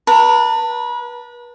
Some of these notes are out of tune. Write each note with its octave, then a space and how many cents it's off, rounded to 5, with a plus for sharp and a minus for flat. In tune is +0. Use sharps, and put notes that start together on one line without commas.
B4 -35 A5 +35